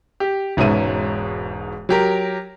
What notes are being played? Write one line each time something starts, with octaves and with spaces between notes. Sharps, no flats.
G4
E1 G#2 B2 C#4 E5 D#7
F#3 G4 A#4